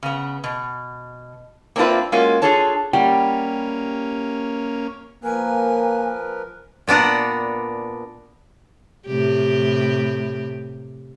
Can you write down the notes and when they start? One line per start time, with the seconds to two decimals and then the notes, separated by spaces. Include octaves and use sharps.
0.03 C#3 B3
0.44 B2
1.76 A#3 C4 D4 E4 F4 B4
2.12 G#3 A#3 C#4 F4 F#4
2.42 D4 F4 G#4 A4 C#5 A5
2.93 G3 A#3 C#4 F#5 G5
5.24 F3 A#3 A#4 B4 G#5
6.87 A#2 B3 D4 A#4 F#5
9.07 A2 C3 G4